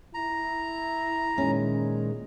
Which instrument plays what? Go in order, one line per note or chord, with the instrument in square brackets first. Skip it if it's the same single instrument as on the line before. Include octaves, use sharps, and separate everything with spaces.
[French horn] E4 [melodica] A#5
[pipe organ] A#2 D#3 G#3 [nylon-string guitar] C#4